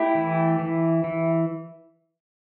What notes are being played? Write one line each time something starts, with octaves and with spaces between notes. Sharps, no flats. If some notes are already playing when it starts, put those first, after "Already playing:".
Already playing: A3 E4 G4
E3
E3
E3